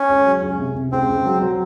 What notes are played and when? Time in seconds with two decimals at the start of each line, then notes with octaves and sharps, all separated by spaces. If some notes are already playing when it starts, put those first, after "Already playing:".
Already playing: C#4
0.09 C#2
0.25 F#3
0.42 C#2
0.59 C3
0.75 C3
0.92 C#2 C4
1.09 C#2
1.25 F#3
1.42 F#3